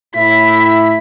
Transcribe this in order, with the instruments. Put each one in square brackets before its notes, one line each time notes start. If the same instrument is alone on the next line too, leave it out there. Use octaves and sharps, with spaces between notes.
[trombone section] A2 E4 [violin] B6